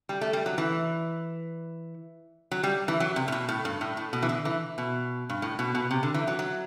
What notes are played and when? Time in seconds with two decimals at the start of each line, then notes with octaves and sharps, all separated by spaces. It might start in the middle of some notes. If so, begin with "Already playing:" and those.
0.09 G3
0.21 A3
0.33 G3
0.46 F#3
0.58 E3
2.51 F#3
2.63 G3
2.88 E3
3.00 F#3
3.16 C3
3.28 A2
3.32 B2
3.49 A2
3.65 G2
3.81 A2
3.97 A2
4.13 B2
4.22 E3
4.29 D3
4.45 E3
4.78 B2
5.30 G2
5.42 A2
5.59 B2
5.75 B2
5.91 C3
6.03 D3
6.14 E3
6.27 F#3
6.39 F#3